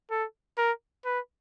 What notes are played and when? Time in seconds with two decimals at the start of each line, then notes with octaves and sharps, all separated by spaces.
0.11 A4
0.58 A#4
1.05 B4